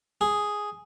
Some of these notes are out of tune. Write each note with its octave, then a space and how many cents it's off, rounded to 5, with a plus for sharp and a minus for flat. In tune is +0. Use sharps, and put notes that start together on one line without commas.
G#4 +0